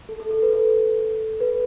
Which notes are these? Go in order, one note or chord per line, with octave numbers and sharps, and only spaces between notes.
A4
A4
A4
B4
A4
B4